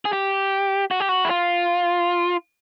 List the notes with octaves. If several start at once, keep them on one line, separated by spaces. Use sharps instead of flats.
G#4
G4
F#4
G4
F#4
E4
F4